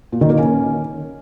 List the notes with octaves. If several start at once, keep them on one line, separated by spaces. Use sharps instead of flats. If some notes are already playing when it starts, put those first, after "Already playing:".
A#2
D#3
A#3
C#4